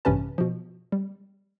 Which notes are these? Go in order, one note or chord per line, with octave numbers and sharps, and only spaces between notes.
A1 G2 C3 C#4 B4 A5
B2 F3
G3